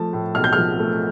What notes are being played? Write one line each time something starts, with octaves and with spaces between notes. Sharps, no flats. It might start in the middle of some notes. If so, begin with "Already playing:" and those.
Already playing: F3 A3 A5
A2
B1 F6
G6
F6
F3
A3